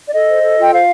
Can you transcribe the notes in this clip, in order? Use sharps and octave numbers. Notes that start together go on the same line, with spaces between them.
D5
A4 D#5
C5
A4
F4 G5
C5 F5